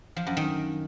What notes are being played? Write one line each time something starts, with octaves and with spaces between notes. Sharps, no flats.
F3
F#2
D#3